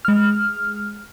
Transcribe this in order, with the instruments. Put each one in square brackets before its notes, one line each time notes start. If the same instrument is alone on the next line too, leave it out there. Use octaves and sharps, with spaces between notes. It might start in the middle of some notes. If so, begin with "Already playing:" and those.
[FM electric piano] G#3 F6